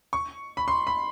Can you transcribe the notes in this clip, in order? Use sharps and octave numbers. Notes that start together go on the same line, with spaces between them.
C#6
B5
C6
B5